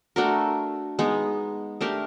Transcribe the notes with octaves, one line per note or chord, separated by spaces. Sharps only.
A3 D4 F#4 A#4
G#3 B3 D#4
A3 D4 G4 A#4